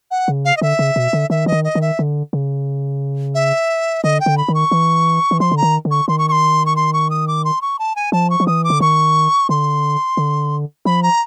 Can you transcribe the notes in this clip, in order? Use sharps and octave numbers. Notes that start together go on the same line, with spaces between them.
F#5
C#3
F5
D#5
D3 E5
C#3
B2
D3
D#3 E5
E3 D#5
D#3
D#5
D#3
E5
D3
C#3
E5
D3 D#5
G5
D3
B5
D#3
C#6
E3
E3
F3 C6
D3
A#5
D#3
D3
C#6
D#3 C6
C#6
C#6
C6
C#6
C6
C#6
D#6
D6
C6
C#6
A5
G#5
F3 A5
C#6
F3
E3 D#6
D6
D3
D#3 C#6
D3 C6
D3
F3 B5
A#5